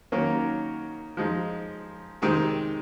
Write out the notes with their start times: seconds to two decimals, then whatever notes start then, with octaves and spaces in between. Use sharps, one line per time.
0.12 D#3 F#3 A#3 C#4
1.17 F3 G#3 D#4
2.22 C3 D#3 G#3 C4 D#4